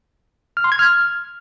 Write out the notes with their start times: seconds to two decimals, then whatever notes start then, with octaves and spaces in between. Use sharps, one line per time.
0.57 F6
0.64 C6
0.72 G#6
0.79 F6